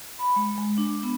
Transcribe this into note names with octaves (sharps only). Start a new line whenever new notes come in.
B5
G#3
G#3
D4
B3